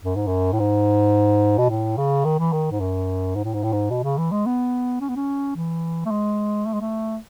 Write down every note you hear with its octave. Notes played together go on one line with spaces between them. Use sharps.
F#2
G#2
F#2
A2
G#2
B2
A2
C#3
D#3
E3
D#3
G#2
F#2
G#2
A2
G#2
A2
G#2
B2
C#3
E3
G#3
B3
C#4
B3
C#4
E3
A3
G#3
A3
G#3
A3